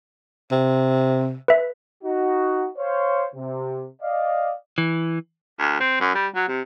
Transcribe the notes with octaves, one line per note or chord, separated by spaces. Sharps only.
C3
B4 E5
D#4 F#4
C5 C#5 F5
C3
D5 D#5 F5
E3
D2
C4
F#2
G3
F#3
C3